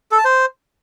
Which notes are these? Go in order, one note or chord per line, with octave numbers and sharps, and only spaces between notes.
A4
A5
C5